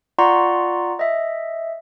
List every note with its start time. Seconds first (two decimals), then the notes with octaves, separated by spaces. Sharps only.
0.19 F4 D5 F#5 A#5 C6 C#6
0.99 D#5 E5